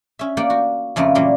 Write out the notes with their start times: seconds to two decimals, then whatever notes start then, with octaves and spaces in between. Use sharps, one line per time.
0.19 C#4 E5
0.37 A#3 G4 D5 F#5 G5
0.50 F#4
0.96 F2 C#3 A3 A#3 B4
1.15 A#2 E3 F#3 G3 C#4